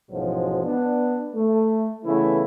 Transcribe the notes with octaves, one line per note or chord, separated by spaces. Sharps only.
A1 G#2 B2 F3 F#3 G#3
B3 D4
A3
C#3 E3 A3 B3 E4